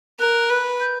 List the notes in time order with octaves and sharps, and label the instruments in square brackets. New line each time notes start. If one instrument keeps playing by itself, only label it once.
[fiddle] A#4 [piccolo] F#6
[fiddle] B4
[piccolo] G6